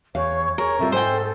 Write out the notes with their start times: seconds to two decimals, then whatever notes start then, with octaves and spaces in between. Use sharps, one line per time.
0.15 E2 C#5 F5
0.58 G#4 A#4 C#5
0.79 C3 G3 F4 A4
0.92 G#2 G#3 C5 G5 G#5